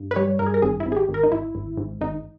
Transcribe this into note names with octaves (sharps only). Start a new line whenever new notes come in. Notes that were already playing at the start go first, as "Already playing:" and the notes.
Already playing: G2
B4
G3 C#5
G2 A#4
G#4
A#4
G#1 G#4
E4
G#1
G#4
G4
G#1
A#4
D#4
G#1 E4
G#1
G#2
G#1 D#4